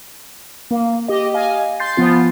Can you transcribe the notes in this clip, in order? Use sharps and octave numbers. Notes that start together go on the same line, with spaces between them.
A#3
G4 D#5
D#5 F5 G#5
C6 G6 A6 C7
F3 B3 F4